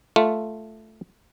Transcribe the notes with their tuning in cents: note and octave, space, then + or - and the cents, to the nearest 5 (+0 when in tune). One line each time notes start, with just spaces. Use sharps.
A3 +0 F4 +0